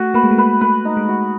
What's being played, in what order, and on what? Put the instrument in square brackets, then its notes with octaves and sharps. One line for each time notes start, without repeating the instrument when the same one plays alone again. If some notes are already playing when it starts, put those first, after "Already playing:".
Already playing: [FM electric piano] A3 [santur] F#4
[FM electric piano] A#3 [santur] B4
[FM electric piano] G#3
A3
[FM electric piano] A#3 [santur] B4
[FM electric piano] A3 [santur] B4
[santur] D#4
[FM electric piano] G#3
[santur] F#4